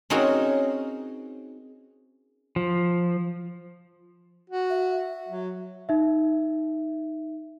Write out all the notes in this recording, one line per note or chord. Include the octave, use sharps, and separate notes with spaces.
C4 C#4 D#4 F#4 G#4 A#4
F3
F#4
E5
F#3
D#4 E5